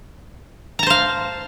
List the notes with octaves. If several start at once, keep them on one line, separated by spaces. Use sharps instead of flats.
C5 F5 A5 A#5